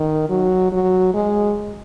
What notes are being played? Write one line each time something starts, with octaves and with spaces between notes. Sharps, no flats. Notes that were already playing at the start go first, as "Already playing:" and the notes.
Already playing: D#3
F#3
F#3
G#3